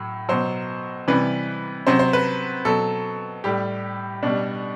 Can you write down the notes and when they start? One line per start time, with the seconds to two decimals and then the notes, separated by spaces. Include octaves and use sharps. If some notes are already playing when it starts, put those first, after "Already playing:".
Already playing: A2 F#3
0.29 B2 F#3 C5
1.08 C3 E3 G3 B4
1.87 C3 F#3 C5
1.99 C5
2.13 B4
2.65 B2 F#3 A4
3.44 A2 G3 G4
4.23 B2 G3 D4